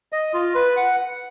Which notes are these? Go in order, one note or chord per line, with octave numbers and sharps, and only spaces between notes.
D#5
F4
B4
F#5